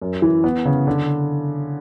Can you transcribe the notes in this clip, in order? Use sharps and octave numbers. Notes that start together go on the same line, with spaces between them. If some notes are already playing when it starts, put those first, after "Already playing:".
F#2
E3
B3
C#3
D3